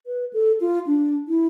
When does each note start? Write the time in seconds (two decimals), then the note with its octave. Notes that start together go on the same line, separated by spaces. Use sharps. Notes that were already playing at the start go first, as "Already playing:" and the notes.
0.07 B4
0.33 A4
0.61 F4
0.87 D4
1.28 E4